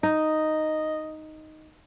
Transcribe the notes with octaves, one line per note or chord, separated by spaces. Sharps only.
D#4 D#5